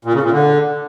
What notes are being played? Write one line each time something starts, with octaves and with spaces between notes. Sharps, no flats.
A#2
C#3
A#2
D3